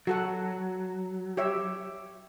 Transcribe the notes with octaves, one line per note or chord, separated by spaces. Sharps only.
F#3 F#4 A4 F#5
G4 C#5 E5